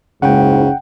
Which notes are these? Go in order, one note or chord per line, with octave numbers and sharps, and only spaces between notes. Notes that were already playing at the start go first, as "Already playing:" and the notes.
F#1 C#2 G#2 C#3 F#5 G5